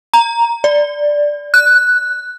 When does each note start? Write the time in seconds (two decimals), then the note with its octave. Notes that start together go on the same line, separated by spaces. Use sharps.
0.14 A#5
0.64 D5
1.54 F#6